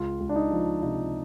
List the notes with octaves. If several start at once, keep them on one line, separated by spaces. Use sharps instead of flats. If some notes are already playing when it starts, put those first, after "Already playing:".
Already playing: C#2 F4
C#2
D4
D#4
F3
C3 D#4